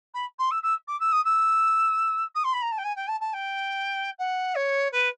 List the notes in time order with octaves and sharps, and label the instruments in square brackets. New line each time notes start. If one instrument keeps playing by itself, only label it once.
[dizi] B5
C6
E6
E6
D6
E6
D#6
E6
D#6
C6
B5
A#5
A5
G5
G#5
G5
A5
A5
G5
F#5
C#5
B4